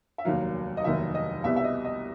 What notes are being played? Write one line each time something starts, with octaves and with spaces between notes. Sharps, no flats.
E5
F1 D#2 D#3 F#3 F5
D#5
F1 D#2 D#3 F#3 E5
D#5
C2 B2 G3 B3 E5
E5
D#5
D#5